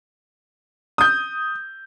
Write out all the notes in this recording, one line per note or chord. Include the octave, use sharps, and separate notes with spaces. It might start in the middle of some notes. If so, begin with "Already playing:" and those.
D#6 G6